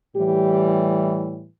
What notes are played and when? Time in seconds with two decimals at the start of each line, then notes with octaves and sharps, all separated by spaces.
0.15 A2 E3 G3 G4